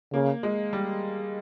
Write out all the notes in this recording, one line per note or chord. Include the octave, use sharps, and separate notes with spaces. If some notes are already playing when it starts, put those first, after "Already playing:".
C#3 A#3
G#3
G3